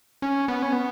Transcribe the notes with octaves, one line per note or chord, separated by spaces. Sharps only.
C#4
B3
C#4
B3